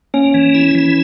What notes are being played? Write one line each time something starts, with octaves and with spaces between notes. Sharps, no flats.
A#3 C#4
E3
E4
E3